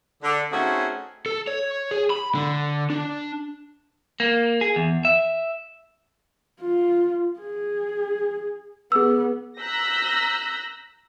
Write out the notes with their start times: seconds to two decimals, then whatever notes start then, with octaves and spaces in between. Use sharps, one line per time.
0.23 D3
0.52 A3 C4 C#4 D#4 F#4 G#4
1.26 A4
1.47 C#5
1.91 G#4
2.10 B5
2.35 D3
2.90 D4
4.20 A#3
4.61 G#4
4.76 E2
5.05 E5
6.61 F4
7.40 G#4
8.92 B3 G#4 E6
9.60 A#5 E6 F#6 G6 A#6 B6